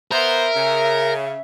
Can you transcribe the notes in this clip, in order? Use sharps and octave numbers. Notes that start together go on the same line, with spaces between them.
B3 A#4 C5 E5
C#3